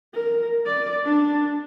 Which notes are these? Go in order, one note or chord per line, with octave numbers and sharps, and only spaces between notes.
A#4
D5
D4